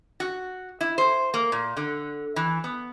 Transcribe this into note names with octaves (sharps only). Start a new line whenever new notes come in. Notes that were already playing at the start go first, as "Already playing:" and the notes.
F#4
E4
C5
A#3
A#2
D3
E3
B3